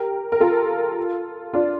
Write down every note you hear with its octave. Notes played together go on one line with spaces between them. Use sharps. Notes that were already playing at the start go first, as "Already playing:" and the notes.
Already playing: G4 A#4
A#4
F4 A4
D4 F4